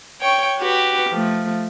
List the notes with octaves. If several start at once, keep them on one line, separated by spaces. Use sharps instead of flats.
C#5 G5 C#6
F#4 G4 B4
F3 A3